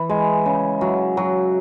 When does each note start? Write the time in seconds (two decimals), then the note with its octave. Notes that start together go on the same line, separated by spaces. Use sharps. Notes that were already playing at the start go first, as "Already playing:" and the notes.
Already playing: E3
0.09 G#3
0.46 C#3
0.81 F#3
1.17 F#3